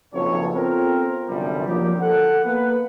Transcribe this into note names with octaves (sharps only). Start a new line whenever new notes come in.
F#1 B1 F3 C4 A4 C#5
B3 C4 F4 A4 A#4
G1 C2 F#2 C3 F3 G3
F3 F#3 A#3 D4 D#4 G4
A4 F#5
A#3 B3 B4